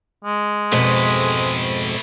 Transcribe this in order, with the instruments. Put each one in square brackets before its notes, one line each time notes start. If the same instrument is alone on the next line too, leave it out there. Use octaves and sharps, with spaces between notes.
[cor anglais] G#3
[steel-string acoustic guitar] F2 G#2 B2 [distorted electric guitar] A3 B4